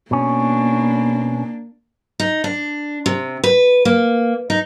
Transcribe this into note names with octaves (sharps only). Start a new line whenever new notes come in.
B2 A#3 C#4 D4
D#4
D4
C3
B4
A#3
D#4